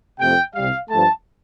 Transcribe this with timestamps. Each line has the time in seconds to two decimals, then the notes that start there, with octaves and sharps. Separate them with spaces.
0.20 F2 C3 A3 G5
0.55 C2 C3 G3 F5
0.89 G2 F3 A3 A5